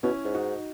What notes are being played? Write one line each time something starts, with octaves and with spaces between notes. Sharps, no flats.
B2 C#4 E4
G#2
D#4 F#4